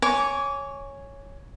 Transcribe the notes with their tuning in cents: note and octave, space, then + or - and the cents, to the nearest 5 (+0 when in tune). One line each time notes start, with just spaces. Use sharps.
C#5 +0 G#5 +0 D6 -30